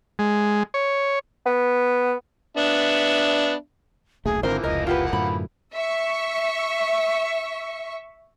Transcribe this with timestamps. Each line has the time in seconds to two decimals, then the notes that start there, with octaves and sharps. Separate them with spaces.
0.19 G#3
0.74 C#5
1.46 B3
2.57 B3 D4 E5
4.25 D#1 B1 A3 G#4
4.43 G#1 D3 E3 F3 A#3 C4 A#4 C5
4.64 F1 C#2 A#4 D#5
4.87 F4 G4 B4 F#5
5.13 F#2 A2 D3 B5
5.74 E5 C#6